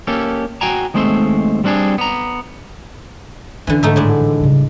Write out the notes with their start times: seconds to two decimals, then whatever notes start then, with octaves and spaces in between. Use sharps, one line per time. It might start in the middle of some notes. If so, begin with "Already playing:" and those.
0.07 A#3 C#4 G4 A4
0.61 F#4 G5 G#5 A#5
0.94 D#2 G#3 A3 C4 C5
1.64 G3 C4 D4 F#4 G#4
1.98 B3 A#5
3.67 D3 E3 C#4 D4
3.83 G#2 D3 A3 D#4 E5
3.96 A2 D#3 G#3 D4
4.09 D3
4.21 E3
4.40 G2 C#3